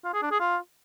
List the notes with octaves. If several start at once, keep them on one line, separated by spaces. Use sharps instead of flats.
F4
G#4
D4
G#4
F4